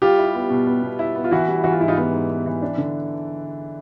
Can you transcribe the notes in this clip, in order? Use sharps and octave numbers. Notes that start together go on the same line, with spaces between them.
G3 F4 G4
E4
B3
B2
B3
B2
E4
B3
F4
E3 E4 F#4
G3
E3 F#4
F4
G#2 E4
D#4 F4
B3
G#2
B3
E3
D4
D3